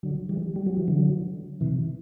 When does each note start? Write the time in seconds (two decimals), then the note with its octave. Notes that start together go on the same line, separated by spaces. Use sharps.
0.03 D3 F#3
0.29 E3 G3
0.56 G3
0.66 F#3
0.77 E3
0.88 D3 F#3
1.61 C3 E3